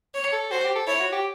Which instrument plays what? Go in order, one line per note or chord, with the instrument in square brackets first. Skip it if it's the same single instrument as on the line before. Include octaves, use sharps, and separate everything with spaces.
[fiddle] C#5
[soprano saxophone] A4
[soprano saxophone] F#4 [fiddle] C5
[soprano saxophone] G4
A4
[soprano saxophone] E4 [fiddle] C#5
[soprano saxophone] F#4
G4